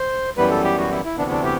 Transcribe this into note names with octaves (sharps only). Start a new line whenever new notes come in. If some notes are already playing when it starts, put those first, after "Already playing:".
Already playing: C5
F#2 E3 G3 B3 B4
A4
G4
F#4
E4
E4
D2 C3 E3 B3 D4
D4
G4